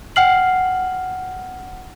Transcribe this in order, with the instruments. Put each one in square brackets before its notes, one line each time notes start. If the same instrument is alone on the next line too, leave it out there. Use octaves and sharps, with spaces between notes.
[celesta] F#5 G5 F6 C7 F#7